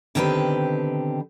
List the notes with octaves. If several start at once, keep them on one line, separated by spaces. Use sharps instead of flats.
B2 D3 D#3 C4 G4 B4